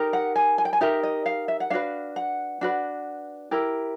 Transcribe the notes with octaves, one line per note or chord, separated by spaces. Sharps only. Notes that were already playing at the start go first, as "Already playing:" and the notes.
Already playing: D#4 G4 A#4
F#5
G#5
G#5
G5
G#5
D#4 G4 A#4 E5
D#5
F5
E5
F#5
D4 F#4 B4 F5
F#5
D4 F#4 B4
E4 G4 A#4